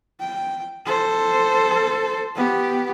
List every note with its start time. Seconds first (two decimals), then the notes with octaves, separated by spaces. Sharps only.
0.20 G5
0.86 A4 C5
2.35 B3 G4